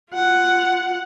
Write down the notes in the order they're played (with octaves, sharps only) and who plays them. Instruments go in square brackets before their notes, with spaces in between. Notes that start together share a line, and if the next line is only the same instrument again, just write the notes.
[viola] F4 F#5